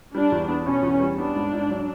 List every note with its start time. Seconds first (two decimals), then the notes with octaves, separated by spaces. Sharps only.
0.14 G3 D4
0.32 E2
0.49 B3
0.65 B2 C#4
0.83 E2
1.00 G3
1.18 B3 D4
1.35 G#2
1.53 G#2
1.70 F#3